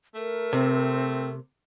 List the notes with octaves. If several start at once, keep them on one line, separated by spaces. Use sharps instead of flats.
A3 A#4
C3 C4